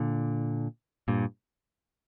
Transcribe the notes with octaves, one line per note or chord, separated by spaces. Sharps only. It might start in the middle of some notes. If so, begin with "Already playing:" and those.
Already playing: A#2 D3
G2 A#2